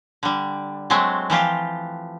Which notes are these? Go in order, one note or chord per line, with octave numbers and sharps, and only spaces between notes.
D3 G3
F#3 G#3 A3 C4
E3 F3 F4 G4